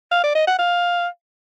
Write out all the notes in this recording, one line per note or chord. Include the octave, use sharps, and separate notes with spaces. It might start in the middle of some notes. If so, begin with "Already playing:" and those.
F5
D5
D#5
F#5
F5